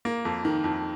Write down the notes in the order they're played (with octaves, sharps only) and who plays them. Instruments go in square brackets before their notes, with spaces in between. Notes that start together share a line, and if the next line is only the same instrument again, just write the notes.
[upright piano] A#3
F2
D#3
F2